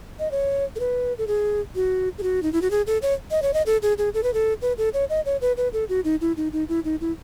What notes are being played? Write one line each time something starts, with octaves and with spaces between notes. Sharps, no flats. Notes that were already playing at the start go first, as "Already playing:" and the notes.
D#5
C#5
A4
B4
A4
G#4
F#4
G#4
F#4
D#4
E4
F#4
G#4
A4
C#5
D#5
C#5
D#5
A4
G#4
G#4
A4
B4
A4
B4
A4
C#5
D#5
C#5
B4
B4
A4
F#4
D#4
E4
D#4
D#4
E4
D#4
E4